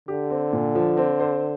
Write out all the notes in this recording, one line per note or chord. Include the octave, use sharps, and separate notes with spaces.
D3 G4
C4
A#2
F3
C4
C5